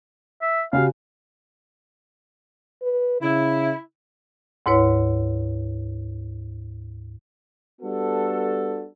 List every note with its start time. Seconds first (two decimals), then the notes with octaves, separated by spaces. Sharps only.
0.42 E5
0.73 C#3 F#4 G4 F5
2.82 B4
3.22 C#3 E4
4.66 D2 G#2 E4 B4 C#5
7.82 G3 B3 D4 F#4 A4